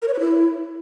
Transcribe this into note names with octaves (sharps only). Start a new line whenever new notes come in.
A#4
C#5
B4
E4